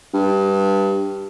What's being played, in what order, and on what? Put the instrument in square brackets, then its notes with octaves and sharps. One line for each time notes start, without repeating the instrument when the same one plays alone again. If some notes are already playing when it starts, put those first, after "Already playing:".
[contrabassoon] G2